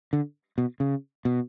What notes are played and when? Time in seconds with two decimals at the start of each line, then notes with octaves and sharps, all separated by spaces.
0.13 D3
0.58 B2
0.80 C#3
1.25 B2